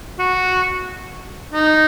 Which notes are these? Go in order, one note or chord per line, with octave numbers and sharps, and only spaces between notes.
F#4
D#4